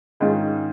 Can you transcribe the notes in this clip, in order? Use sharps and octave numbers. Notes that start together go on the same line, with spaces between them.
G#2 D#3 G#3 C#4 F4